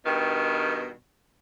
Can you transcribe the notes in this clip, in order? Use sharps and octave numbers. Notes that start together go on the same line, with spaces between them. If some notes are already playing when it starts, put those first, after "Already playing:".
G2 B2 D#3